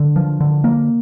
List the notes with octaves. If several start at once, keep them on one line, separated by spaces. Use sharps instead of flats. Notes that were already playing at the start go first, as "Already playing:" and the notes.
Already playing: D3
F3
D3
A#3